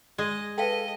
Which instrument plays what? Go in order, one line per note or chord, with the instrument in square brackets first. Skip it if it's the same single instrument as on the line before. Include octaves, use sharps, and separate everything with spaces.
[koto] G#3 [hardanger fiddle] D#5
[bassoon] A4 [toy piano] B4 F5 G5 [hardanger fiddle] D#5